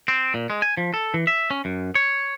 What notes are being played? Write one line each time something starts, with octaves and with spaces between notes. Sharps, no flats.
C4
A#2
G#3
G#5
F3
A4
E3
E5
C#4
F#2
C#5